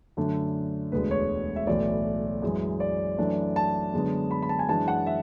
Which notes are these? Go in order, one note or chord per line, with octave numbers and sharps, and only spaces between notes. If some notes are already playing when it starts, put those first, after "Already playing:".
F#2 D3 A3 D4
E1 D2 D3 G#3 B3 B4
C#5
E5
B1 A2 E3 A3 D5
F#2 E3 G#3
D5
F#2 E3 A3 D4
A5
F#2 D3 G#3 B3 D4
B5
B5
A5
G#5
F#2 E3 G#3 D4 A5
F#5
E5